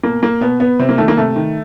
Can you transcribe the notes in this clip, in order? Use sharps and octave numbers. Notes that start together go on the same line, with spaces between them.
B2 A#3
A#3
B2 B3
B3
C3 C4
A#3
D#3 A3
A#3
C3 A3
D#3